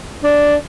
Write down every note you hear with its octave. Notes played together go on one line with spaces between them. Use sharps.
D4